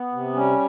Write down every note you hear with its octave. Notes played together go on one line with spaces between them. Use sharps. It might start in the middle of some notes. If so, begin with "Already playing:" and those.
Already playing: B3
C3
G3 C#4